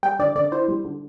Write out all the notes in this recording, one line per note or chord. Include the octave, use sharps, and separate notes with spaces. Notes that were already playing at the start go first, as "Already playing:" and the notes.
G3 G5
D3 D5
D3 D5
E4 C5
G3
D3